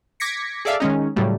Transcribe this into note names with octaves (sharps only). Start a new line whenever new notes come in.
D6 G#6 A#6 B6 C#7
G#4 A4 D5 E5 F5
D#3 G#3 C#4 D#4
A2 C#3 F#3 G3 A3